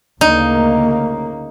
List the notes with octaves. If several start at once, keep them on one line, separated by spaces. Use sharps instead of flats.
D2 C#3 A#3 D#4